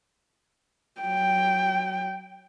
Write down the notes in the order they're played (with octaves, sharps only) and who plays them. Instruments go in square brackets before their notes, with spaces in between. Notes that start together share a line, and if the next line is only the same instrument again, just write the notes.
[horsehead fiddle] F#3 G5